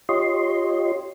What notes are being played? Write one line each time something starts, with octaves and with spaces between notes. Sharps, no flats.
F4 G4 C#5 D#5 C6